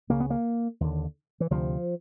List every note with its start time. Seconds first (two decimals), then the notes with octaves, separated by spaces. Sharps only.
0.09 C#2 C#3 A#3
0.20 B3
0.30 A#3
0.80 D#2 D3
1.40 E3
1.50 D2 C3 F3